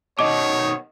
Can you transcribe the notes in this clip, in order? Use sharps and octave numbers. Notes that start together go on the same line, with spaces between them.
B2 D#3 C#5 D#5 D6